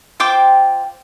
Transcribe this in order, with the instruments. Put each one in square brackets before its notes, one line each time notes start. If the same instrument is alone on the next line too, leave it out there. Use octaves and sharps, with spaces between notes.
[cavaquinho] F4 C5 G5 D6